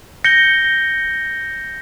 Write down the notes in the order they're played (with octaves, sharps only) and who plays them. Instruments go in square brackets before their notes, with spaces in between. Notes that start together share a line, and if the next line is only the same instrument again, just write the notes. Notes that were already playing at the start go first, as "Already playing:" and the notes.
[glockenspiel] G6 A#6 C#7 G7